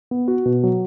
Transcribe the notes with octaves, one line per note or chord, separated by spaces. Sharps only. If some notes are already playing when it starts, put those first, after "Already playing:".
B3
F#4
B2
F#3